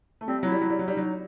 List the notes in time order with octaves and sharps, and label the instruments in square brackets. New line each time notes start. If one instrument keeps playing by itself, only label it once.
[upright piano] A3
[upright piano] G3 [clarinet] C4
[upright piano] F#3 [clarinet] E4
[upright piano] G3
F#3
G3
F#3
[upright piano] G3 [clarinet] D#4
[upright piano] F#3